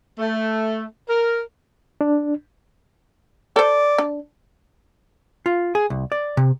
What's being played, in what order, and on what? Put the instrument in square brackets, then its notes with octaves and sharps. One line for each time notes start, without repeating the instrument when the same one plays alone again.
[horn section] A3
A#4
[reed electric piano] D4
[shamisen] A4 C5 [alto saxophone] D5
[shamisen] D4
[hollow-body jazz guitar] F4
G#4
C2
D5
C3